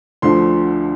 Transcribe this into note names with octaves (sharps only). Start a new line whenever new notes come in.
D2 D3 F3 C6